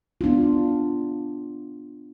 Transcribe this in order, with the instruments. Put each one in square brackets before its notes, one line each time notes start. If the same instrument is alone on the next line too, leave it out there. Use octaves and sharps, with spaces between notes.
[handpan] B3 D4 E4 F4